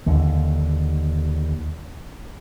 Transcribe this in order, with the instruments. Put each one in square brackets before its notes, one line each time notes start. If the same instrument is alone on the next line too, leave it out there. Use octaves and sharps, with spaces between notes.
[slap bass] D#2 D3